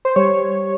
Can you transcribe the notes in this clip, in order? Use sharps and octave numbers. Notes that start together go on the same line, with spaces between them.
C5
G3 C#5